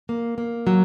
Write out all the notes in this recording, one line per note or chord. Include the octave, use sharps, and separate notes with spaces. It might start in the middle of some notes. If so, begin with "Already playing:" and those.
A#3
A#3
F#3